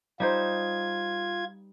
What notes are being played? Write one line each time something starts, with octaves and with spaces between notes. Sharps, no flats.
G3 D#4 F4 C5 G#6